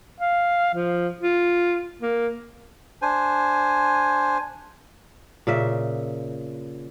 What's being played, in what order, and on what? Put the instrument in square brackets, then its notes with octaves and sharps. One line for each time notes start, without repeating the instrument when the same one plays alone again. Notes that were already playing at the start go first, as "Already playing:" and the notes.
[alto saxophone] F5
F3
F4
A#3
[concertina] D4 C5 G#5
[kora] A#2 C#3 E5